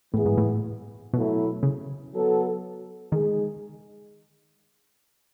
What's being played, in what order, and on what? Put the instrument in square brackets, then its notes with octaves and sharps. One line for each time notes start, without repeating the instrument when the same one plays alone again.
[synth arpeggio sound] A2 [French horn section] E3 B3 E4 G#4
[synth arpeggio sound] G#2
A2
[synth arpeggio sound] B2 [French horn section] F#3 A3 E4
[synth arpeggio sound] C#3
[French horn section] F#3 B3 F#4 A4
[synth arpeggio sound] D#3 [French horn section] G#3 D#4 G#4